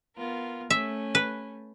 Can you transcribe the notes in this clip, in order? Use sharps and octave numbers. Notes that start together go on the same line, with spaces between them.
B3 F4 A#4
A3 C#4 E5
B4